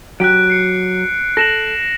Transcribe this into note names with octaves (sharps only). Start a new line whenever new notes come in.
F#3 G4 F#6 D7
C7 C#7
A4 A#6 E7 F#7